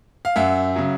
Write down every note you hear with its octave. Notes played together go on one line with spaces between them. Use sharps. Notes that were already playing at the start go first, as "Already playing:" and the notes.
F5
F#2 E5 F#5
C#3 F#3